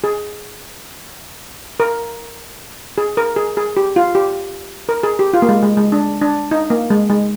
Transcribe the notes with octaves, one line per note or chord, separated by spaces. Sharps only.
G#4
A#4
G#4
A#4
G#4
G#4
G4
F4
G4
A#4
G#4
G4
F4
A#3
G#3
G#3
G#3
D4
D4
D#4
A#3
G#3
G#3